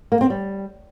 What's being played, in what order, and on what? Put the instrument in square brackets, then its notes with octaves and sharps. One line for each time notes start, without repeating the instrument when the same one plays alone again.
[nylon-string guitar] A#3
C4
G3